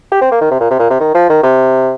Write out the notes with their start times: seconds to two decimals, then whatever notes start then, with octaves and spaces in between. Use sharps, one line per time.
0.12 G4
0.21 C4
0.32 A#3
0.41 D#3
0.51 C3
0.60 A#2
0.71 C3
0.79 A#2
0.90 C3
1.00 D#3
1.15 F3
1.30 D#3
1.43 C3